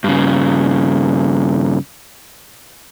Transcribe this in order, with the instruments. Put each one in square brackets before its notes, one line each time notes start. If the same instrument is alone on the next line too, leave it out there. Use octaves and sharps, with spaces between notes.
[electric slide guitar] G2 C#3